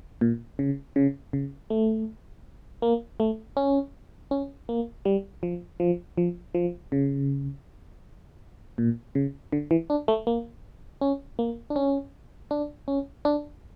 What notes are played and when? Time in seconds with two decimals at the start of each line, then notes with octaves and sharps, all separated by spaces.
0.21 A#2
0.59 C#3
0.96 C#3
1.33 C#3
1.70 A3
2.82 A#3
3.20 A3
3.57 C#4
4.31 C#4
4.69 A#3
5.05 G3
5.43 F3
5.80 F3
6.17 F3
6.55 F3
6.92 C#3
8.78 A#2
9.15 C#3
9.52 D3
9.71 E3
9.90 D4
10.08 A3
10.27 A#3
11.01 C#4
11.39 A#3
11.70 D4
11.76 C#4
12.51 D4
12.88 C#4
13.25 D4